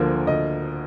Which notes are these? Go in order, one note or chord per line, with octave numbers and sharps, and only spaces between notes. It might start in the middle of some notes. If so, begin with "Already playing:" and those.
Already playing: D2 D3 F3 A#3 A#4
D2 D#5